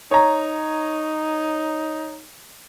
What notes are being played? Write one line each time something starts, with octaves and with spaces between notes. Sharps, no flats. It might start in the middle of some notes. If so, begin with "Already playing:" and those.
D#4 C#5 A#5